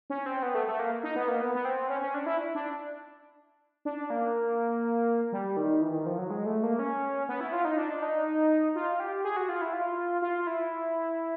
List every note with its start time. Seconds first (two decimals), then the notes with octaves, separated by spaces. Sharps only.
0.10 C#4
0.26 C4
0.43 B3
0.55 A3
0.67 A3
0.79 A#3
1.03 D#4
1.16 B3
1.28 A#3
1.41 B3
1.55 B3
1.65 C4
1.89 C#4
2.01 C#4
2.14 D4
2.26 E4
2.55 D4
3.85 D4
4.10 A#3
5.32 G3
5.57 D#3
5.81 E3
5.94 D#3
6.06 F3
6.18 F#3
6.30 G#3
6.46 A3
6.63 A#3
6.79 C#4
7.29 B3
7.40 E4
7.53 F4
7.65 D#4
7.78 D4
8.02 D#4
8.75 F4
9.00 G4
9.24 G#4
9.37 F#4
9.49 F4
9.61 E4
9.74 F4
10.22 F4
10.47 E4